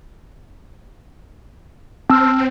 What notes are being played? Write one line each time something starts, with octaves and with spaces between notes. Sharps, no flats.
C4 A5 E6 F6